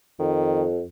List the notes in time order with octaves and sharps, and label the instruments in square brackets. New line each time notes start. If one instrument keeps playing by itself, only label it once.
[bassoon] F2 [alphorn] D#3